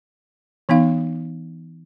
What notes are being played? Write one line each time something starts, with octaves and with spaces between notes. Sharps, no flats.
E3 B3 D#4 F5